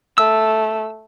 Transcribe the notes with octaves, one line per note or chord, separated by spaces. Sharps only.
A3 E6